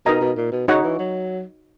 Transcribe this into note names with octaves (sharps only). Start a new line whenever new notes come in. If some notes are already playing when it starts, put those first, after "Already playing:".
B2 D#4 A#4 D#5 A#5
B2
A#2
B2
C#3 D#4 F#4 C#5 F#5
E3
F#3